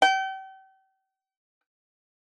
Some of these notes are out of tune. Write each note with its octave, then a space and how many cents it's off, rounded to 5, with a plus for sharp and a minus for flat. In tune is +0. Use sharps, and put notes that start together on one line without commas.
G5 -40